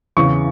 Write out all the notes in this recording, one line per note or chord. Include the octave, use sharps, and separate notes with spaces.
E2 C#3 E3 C#6